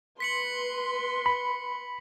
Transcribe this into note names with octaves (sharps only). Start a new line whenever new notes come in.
B4 C6 B6 C#7 F#7
B5